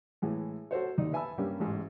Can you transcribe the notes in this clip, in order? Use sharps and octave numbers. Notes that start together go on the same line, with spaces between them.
A2 E3 G#3
F#4 A4 C5 C#5
D#2 D#4 D5
B4 E5 G#5 A5 B5 E6
G2 G3 A#3 C#4 G4
A1 G#2